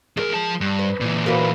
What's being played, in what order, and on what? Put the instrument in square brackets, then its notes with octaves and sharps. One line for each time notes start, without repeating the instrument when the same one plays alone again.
[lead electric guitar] E2 A#4 [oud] G#3
[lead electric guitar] F3 A5
G2
[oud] B4
[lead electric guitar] A#2 E3
[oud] A#3 F#4 B4